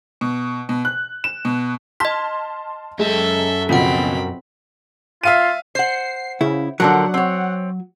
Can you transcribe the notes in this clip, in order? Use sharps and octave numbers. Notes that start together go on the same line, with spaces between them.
B2
B2
F#6
E7
B2
D#5 A5 C6 F6 B6
F#2 G#3 A4 E5 A5
C#2 B2 F3 C4 F#4 F#5 B5
F4 E5 F5 D#7
C5 F#5 C7
C#3 E4
D3 F3 F#3 A#4 F#5
C4 C#5